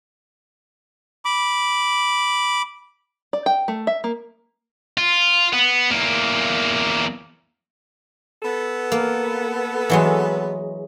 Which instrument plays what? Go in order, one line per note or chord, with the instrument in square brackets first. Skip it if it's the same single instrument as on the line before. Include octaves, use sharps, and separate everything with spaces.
[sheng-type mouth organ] B5 D6
[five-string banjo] D5
G5
A3
E5
A#3
[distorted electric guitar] F4
B3
E2 A#3
[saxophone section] B3 A4
[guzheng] A#3
E3 F#3 G#3